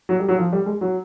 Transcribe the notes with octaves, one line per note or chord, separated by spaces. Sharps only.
F#3
G3
F#3
F3
G3
G#3
F#3